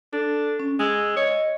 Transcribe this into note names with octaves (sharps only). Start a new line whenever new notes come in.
D4 A4
C#4
G#3 E6
C#5 D#5